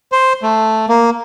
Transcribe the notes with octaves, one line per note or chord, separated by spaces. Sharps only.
C5
A3
A#3